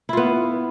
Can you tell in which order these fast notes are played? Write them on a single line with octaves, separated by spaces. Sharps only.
E4 F4 B3